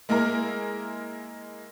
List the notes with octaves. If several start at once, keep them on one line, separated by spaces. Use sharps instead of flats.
G#3 A#3 E4 G#4 A#4